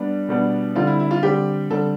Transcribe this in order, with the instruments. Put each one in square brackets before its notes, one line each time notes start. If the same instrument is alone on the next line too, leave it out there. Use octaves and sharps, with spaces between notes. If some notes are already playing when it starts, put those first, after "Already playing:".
Already playing: [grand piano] G3 B3 D4
B2 G3 B3 D4
[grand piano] D3 G3 C4 [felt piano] F4
[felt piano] E4
E4
F4
[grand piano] D3 G3 C4 [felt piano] G4
[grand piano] D3 G3 C4 [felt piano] A4